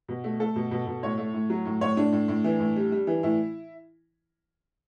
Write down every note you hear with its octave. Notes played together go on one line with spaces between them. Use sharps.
B2
A3
A3 A4
B2
B2
B2
A2 C#5
A3
A2
F#3
A2
A2 C#5
A2 D4
A2
A2
E3
A2
G3
G3
E3
A2 E4